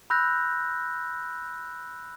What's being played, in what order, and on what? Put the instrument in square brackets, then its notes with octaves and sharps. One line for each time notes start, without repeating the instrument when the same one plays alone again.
[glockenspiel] B5 E6 F#6 G6 A#6